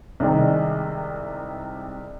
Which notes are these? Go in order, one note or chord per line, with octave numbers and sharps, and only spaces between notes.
C2 C3 D#3 G#3